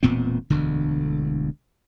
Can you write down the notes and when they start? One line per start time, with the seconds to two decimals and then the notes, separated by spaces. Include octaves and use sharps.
0.03 E1 A#2 B3 C4
0.50 E1 D2 D3